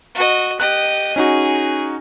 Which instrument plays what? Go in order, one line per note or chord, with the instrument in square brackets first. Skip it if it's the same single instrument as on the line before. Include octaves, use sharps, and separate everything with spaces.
[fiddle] F#4 D#5
[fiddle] G4 D#5 [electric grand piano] F#6
[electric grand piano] C#4 D#4 F#4 [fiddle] G#4